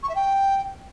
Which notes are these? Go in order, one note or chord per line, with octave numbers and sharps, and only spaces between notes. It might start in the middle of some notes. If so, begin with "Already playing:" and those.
C#6
E5
G5